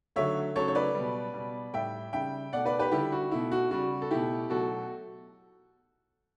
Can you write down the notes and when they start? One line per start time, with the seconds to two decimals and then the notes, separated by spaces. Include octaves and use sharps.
0.16 D3 F#3 A3 C#5 E5
0.56 C#3 F#3 A3 A4 C#5
0.68 C#5
0.75 B4 D5
0.95 B2 G3
1.34 B2 G3
1.73 A2 G3 E5 G5
2.13 C#3 G3 E5 G5
2.53 B2 A3 D5 F#5
2.65 B4 D5
2.79 G4 B4
2.92 D3 G3 E4 G4
3.12 F#4
3.31 B2 A3 E4
3.52 F#4
3.71 C#3 G3 F#4
4.02 A4
4.10 B2 A3 E4 G4
4.50 B2 F#3 A3 F#4 A4